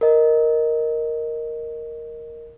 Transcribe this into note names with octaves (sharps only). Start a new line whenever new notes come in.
A#4 D#5